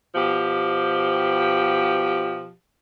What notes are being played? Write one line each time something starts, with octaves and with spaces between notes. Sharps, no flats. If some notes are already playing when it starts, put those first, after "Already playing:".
B2 F3 G4